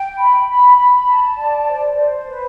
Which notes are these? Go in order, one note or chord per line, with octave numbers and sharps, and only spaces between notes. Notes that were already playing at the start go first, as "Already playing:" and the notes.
Already playing: G5
B5
B5
B5
A5
D5
C5
C5
B4